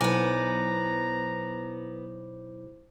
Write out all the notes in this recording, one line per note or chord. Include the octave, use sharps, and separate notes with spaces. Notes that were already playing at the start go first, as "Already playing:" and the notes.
B1 B3 E4 C5 G#5 A#5 D6